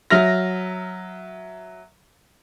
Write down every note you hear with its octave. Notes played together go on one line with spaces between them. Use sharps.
F#3 E5 F6 A#6